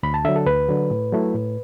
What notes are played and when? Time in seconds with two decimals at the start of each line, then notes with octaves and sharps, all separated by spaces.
0.03 D2 B5
0.14 A5
0.25 D3 F#3 E5
0.36 A4
0.47 D2 B4
0.69 D3 F#3
0.90 A2
1.13 F#3 A3 E4
1.34 A2